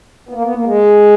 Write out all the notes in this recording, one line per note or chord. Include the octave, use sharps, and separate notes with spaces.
B3
A#3
B3
A#3
G#3